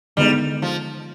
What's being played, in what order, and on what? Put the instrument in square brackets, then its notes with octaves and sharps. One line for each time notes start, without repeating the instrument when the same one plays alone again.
[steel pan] D3 G#3 B3 D#4 [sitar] G3
[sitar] F3